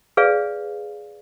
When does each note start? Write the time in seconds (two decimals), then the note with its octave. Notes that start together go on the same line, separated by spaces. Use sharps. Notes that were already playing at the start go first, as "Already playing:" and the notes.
0.17 G#4 B4 D5 F5